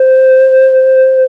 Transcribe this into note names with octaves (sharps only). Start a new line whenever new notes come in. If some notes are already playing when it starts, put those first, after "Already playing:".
Already playing: C5